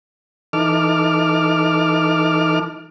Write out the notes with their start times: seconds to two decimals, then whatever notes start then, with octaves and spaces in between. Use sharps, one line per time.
0.53 E3 D#4 A4 D6 F6